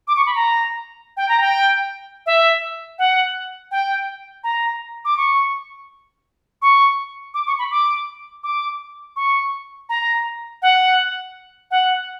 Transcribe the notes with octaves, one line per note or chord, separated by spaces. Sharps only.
D6
C#6
B5
A#5
G5
A#5
G5
E5
F#5
G5
A#5
D6
C#6
C#6
D6
C#6
B5
D6
D6
C#6
A#5
F#5
F#5